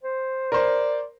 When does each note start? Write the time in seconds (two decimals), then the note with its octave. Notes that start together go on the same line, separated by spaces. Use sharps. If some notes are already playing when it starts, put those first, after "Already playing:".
0.03 C5
0.52 A#4 C5 D5